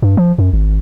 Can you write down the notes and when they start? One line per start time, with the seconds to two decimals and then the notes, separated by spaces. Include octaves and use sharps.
0.02 G2
0.17 F3
0.38 F#2
0.53 G#1